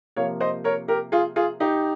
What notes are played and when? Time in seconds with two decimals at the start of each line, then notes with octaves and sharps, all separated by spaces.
0.16 C3 F3 A#3 C#5 F5
0.40 C5 D#5
0.64 A#4 C#5
0.88 G4 A#4
1.12 F4 G#4
1.36 F4 G#4
1.60 D#4 G4